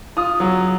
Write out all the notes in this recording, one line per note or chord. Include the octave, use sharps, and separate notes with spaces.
F4 D#6
F#3